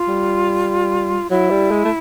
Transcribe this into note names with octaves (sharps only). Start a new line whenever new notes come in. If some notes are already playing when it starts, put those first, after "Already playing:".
Already playing: F4
G3
F#3 E4
G3
G#3
A3